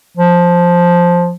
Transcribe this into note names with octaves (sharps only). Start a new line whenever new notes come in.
F3